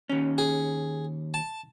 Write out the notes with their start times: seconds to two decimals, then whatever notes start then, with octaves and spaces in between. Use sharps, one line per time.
0.09 D#2 C#4
0.38 G#4
1.34 A5